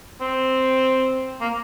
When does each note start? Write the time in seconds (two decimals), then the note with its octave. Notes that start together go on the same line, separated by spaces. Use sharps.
0.21 C4
1.41 A#3